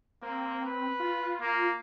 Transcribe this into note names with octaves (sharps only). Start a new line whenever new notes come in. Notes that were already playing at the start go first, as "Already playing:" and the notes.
A#3 C4
B4
F4
A#3